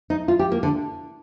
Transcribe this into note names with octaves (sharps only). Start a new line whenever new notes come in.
D#4
F4
G4
A#3
D3